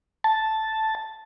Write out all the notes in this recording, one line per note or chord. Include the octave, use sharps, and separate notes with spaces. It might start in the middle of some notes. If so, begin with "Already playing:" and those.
A5